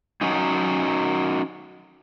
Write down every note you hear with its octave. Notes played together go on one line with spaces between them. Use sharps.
F#3 C#4 D#4